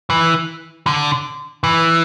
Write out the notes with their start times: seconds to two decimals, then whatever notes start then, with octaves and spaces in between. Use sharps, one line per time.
0.10 E3
0.87 D3
1.64 E3